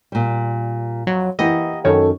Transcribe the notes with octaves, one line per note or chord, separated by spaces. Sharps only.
A#2 G3
F2 F#3
E3 A#3 G4 D#5 F#5
F#2 D#3 A4 C#5